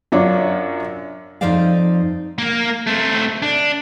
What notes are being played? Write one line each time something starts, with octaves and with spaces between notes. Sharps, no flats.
F#2 D4 F4 C#5
F2 F3 D#4 C5 D5 F5
A#3 A#4
A3 C4
D4